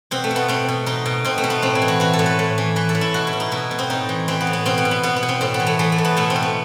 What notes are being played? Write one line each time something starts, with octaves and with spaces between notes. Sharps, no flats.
B2 C4
A3
B2
B3
B2 C4
B2
B2 D#4
B2
B2 C4
A3
B2
B3
A2 C4
E4
E3
F#4
E3 F#4
A4
A2
B4
A2
E3
E3 B4
A4
A2
E4
B2 F#4
E4
B2
D#4
B2 E4
B2
C4
A2 D#4
E3
E3 C4
B3
A2
B3
B2 C4
B3
B2
B3
B2 B3
B3
B2
C4
A2 C4
B3
E3
A3
E3 A3
A3
A2
B3
B2 A3
C4
B2
B3